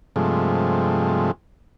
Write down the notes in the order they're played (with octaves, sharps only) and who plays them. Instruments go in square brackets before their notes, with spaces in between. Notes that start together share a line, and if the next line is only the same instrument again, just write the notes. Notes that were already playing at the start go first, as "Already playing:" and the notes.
[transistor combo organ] G2 C3 F3 G#3 A3